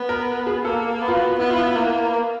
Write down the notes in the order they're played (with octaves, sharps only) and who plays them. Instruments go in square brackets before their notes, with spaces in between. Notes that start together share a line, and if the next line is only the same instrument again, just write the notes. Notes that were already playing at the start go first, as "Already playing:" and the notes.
Already playing: [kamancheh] B3
[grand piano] A#4
G#4
[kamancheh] A#3 [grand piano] A4
[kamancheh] B3
[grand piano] F4
F#4
[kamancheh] B3 [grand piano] E4
[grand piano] F4
E4
[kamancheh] A#3